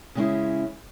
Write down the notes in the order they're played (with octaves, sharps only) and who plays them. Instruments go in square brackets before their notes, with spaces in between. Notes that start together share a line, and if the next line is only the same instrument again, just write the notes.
[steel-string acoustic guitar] C#3 G#3 C#4 E4